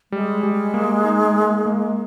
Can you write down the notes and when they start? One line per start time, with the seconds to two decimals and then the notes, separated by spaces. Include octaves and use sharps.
0.12 G3 G#3
0.43 G3
0.74 A#3
1.05 D#4
1.35 A#3
1.66 A#3